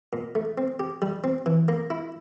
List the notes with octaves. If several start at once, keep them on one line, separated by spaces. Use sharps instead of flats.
A#2
A3
C4
G4
G3
C4
E3
A#3
E4